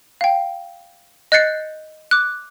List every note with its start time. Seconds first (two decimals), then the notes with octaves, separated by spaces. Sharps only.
0.21 F5 G5
1.32 D#5 F#6 G6 A6 C7 C#7
2.11 D6 F#6